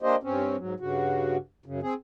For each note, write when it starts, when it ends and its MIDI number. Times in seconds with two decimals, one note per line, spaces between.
0.02 0.16 58
0.02 0.16 62
0.02 0.16 67
0.02 0.16 72
0.02 0.16 75
0.23 0.56 43
0.23 0.56 60
0.23 0.56 61
0.58 0.74 44
0.58 0.74 54
0.80 1.37 43
0.80 1.37 49
0.80 1.37 66
1.66 1.80 42
1.66 1.80 49
1.83 1.94 60
1.83 1.94 68